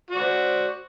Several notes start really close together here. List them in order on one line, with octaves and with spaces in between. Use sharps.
F#4 D5 C5